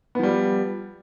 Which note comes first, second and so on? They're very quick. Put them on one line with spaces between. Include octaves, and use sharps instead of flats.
B3 F3 G3